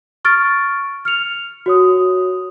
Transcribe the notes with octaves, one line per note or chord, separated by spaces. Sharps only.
C#6 F6 A6 D7
F6 C#7 F7
F#4 C#5 D#6